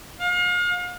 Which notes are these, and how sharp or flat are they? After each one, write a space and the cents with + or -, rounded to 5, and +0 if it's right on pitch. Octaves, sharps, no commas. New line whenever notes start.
F5 +40